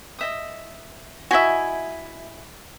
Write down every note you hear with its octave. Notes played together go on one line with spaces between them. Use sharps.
D#5 E5 D#6
E4 F#4 D#5 E5 G#5